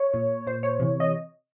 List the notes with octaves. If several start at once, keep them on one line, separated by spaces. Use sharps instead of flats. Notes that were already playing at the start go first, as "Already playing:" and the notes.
Already playing: C#5
A#2
A#2 C5
C#5
C3 E3
D#5